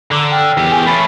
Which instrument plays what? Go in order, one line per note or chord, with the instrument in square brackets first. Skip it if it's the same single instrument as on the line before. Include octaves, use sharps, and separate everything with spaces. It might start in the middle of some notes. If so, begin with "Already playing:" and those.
[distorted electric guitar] D3 [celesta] A#5 D6 E6
[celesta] G5 E6 F6
[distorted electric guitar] E2 G4
[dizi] G#5
[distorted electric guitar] A3 C#4 [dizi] B5 [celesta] A6 C7 D7